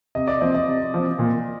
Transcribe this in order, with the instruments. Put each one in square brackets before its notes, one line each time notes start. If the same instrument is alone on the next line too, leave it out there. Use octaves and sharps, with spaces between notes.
[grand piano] C3 [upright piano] D#5
[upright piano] D5
[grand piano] F3 C4 [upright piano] D#5
[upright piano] D#5
[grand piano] C3
F3 C4
A#2